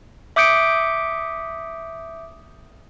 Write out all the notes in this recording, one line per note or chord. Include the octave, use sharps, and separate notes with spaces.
E5 D6 D#6 G6 C#7 D7